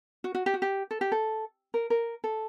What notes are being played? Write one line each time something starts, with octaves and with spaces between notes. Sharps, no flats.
F#4
F#4
G4
F#4
G4
A4
G4
A4
A#4
A#4
A4